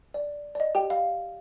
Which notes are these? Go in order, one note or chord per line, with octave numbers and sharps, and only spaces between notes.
D5
D5
D#5
G4 G5
F5